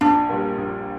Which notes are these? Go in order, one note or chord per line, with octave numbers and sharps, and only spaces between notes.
A#1 D4
A#2 G3
A#1